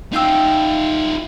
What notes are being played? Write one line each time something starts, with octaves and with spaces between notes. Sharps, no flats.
D#4 F4 F5 G5 E6